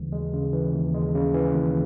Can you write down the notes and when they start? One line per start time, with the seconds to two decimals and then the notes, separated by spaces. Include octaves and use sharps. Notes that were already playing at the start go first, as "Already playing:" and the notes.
Already playing: D#2 C#3 E3 G#3
0.12 G#3
0.34 C#3
0.53 E3
0.74 D#2
0.94 G#3
1.15 C#3
1.34 E3
1.55 D#2